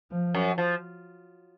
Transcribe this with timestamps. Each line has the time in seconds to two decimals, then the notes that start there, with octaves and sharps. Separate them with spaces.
0.11 F3
0.34 F#2
0.58 F3